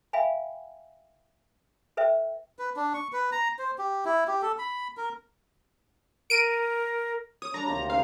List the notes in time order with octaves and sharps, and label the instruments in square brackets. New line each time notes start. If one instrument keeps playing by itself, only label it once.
[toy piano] E5 F5 G5 G#5 B5
A4 B4 C5 E5 G5
[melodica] B4
D4
C#6
B4
A#5
C5
G4
E4
G4
A4
B5
A#4
[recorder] A#4 [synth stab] D7 D#7
[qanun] C#5 [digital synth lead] D#6
[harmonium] G3 D4 [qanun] C#5 D5 A5 [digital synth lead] A#5
[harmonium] D2 [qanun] C3 D#3 C4 [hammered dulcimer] A#3
[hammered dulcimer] C#3 C4 A#4 [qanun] D#4 [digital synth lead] F5